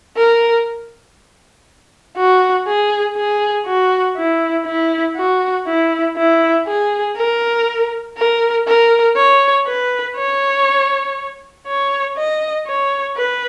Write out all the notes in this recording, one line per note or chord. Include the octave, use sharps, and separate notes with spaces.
A#4
F#4
G#4
G#4
F#4
E4
E4
F#4
E4
E4
G#4
A#4
A#4
A#4
C#5
B4
C#5
C#5
D#5
C#5
B4